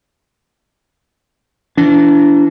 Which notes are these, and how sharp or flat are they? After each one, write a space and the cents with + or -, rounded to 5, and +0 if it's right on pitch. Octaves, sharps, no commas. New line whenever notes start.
E3 +35 D4 -30